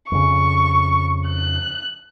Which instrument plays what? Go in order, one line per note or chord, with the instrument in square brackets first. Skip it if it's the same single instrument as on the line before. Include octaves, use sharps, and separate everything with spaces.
[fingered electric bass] F2 C#3 [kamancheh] C#6
[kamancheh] F#6